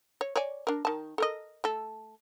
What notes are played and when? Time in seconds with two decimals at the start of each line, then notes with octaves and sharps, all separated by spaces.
0.21 C#5
0.36 C#5 D5 G#5
0.67 D4 A#4
0.85 D#3 A5
1.18 A4 A#4 D#5
1.64 A3 A4